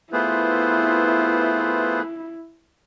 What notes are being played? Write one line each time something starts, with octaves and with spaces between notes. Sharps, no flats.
A3 B3 E4 F4 G#4 B4 C5